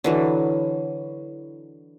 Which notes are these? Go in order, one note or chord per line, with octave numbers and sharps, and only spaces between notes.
D3 E3 F#3